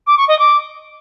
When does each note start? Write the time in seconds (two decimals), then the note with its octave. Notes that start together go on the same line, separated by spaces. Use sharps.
0.06 D6
0.17 C#6
0.28 D#5
0.39 D6